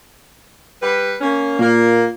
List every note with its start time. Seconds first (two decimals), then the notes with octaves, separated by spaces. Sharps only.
0.81 G3 B4
1.20 A#3 C#4
1.59 A#2 A#3